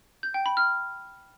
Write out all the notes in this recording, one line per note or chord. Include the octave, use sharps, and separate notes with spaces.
G6
G5
B5
F6